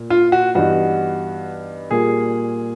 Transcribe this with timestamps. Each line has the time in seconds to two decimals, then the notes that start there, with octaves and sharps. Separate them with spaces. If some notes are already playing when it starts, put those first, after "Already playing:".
Already playing: A#2
0.10 F4
0.32 F#4
0.55 G2 E3 G3 B3 D#4 F#4
1.91 A#2 G3 A#3 G#4